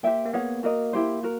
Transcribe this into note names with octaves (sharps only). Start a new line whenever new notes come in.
A#3 G4 C5 E5 G5
A#3
B3 G#4 C#5 F#5
A#3 F#4 A#4 D#5
E4 G4 C5
F#4 A#4